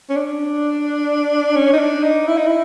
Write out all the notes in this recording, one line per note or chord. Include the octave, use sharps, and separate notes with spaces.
C#4
D4
C#4
D#4
D4
D#4
E4
D#4
E4